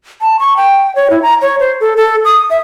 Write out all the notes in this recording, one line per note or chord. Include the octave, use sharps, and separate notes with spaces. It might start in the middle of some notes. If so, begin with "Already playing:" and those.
A5
C#6
G5
C#5
E4
A#5
C#5
C5
A4
A4
D#6
E5